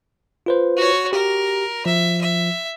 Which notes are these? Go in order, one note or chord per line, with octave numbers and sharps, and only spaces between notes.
F4 B4 C5
F#4 C#5
G4 A#4
F3 E5
E5